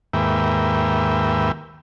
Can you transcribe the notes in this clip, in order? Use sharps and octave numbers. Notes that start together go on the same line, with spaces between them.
D#2 G#2 A#3 B4 E5 G5